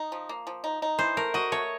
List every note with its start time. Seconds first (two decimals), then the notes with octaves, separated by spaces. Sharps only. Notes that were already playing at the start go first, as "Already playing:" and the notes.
Already playing: D#4
0.12 F3
0.29 A#3
0.47 F3
0.64 D#4
0.82 D#4
0.99 E3 C5
1.17 A3 A#4
1.34 F#4 D#5
1.52 A3 C#5